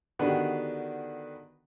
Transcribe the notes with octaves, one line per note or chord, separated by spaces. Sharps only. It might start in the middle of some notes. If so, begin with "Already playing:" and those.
D3 D#3 B3 D4 F#4 G4